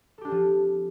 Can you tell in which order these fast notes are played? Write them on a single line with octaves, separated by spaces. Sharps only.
A4 G4 D4 C4 F3